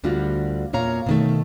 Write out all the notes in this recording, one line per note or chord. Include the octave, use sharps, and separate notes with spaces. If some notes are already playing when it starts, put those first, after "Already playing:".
D2 D3 G3 F4 F#4
E2 A#2 C#5 F5 A#5
B2 D#3 A3